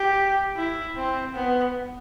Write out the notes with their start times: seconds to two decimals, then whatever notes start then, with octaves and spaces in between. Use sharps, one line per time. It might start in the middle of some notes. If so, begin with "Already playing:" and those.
Already playing: G4
0.57 E4
0.96 C4
1.35 B3